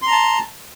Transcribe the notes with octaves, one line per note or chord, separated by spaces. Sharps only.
A5 A#5 C6